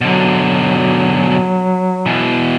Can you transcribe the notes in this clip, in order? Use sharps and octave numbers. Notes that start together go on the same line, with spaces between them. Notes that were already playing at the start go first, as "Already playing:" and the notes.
B2 D3 F#3
B2 E3